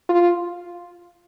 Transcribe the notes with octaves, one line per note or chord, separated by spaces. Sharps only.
F4